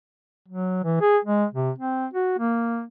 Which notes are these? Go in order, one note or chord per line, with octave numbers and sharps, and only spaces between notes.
F#3
E3
G#4
G#3
C3
C4
F#4
A#3